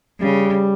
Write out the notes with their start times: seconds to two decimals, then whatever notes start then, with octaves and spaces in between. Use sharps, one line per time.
0.21 C#3 G3